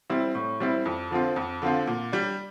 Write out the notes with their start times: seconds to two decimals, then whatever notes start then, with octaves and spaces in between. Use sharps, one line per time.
0.10 G3 C4 E4
0.35 A2
0.60 G3 C4 E4
0.86 F2
1.10 D3 F3 C4 F4
1.36 F2
1.62 D3 F3 C4 F4
1.87 A#2
2.12 G3 D4